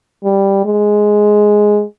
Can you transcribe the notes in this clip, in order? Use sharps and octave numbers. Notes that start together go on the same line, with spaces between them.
G3
G#3